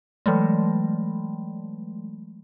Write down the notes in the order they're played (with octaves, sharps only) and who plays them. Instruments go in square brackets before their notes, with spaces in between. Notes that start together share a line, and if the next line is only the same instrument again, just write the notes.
[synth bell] E3 F#3 G#3 A3